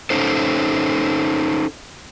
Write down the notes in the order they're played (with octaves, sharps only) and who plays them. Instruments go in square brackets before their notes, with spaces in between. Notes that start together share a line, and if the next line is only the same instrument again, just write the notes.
[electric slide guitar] C#4 D#4 A4 C5